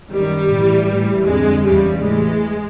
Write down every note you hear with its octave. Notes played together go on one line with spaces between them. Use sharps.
F#2 D#3 G3
A2 E3
A2 E3
F2 D3 G#3
E2 C#3 E3 G3
A2 E3 G#3